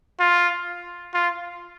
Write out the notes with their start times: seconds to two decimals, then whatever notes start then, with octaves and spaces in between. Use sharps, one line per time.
0.20 F4
1.14 F4